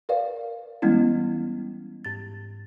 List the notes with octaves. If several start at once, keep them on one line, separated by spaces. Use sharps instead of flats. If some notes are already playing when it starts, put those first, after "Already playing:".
A#4 B4 D5 F5
E3 G3 G#3 B3 C#4 E4
G#2 A6